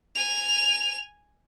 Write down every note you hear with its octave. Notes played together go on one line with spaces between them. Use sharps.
G#5 F7